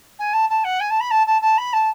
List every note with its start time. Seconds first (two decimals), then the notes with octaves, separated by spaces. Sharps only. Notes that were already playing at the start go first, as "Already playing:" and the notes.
0.19 G#5
0.33 A5
0.49 A5
0.64 F#5
0.80 G#5
0.90 A5
1.00 B5
1.10 A5
1.26 A5
1.41 A5
1.57 B5
1.73 A5